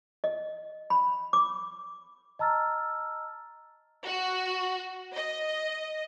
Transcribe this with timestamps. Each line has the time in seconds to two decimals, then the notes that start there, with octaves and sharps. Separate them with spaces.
0.24 D#5
0.90 B5
1.33 D6
2.39 D#5 A5 A#5 E6 F6 A6
4.05 F#4
5.15 D#5